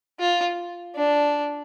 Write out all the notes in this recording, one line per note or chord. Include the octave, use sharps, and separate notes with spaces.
F4
D4